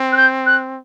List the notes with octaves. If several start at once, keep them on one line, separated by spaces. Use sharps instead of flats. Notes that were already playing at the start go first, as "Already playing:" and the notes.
Already playing: C4
F#6
G6
F#6